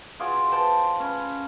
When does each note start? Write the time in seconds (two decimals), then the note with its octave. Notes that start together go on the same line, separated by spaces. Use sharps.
0.20 F4 F#4 G#4 D5
0.52 C5 G5 A5 C6
1.00 C#4 B5